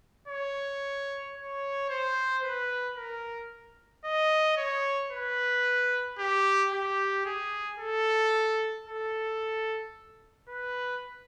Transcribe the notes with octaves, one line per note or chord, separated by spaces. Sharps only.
C#5
C#5
C5
B4
A#4
D#5
C#5
B4
G4
G4
G#4
A4
A4
B4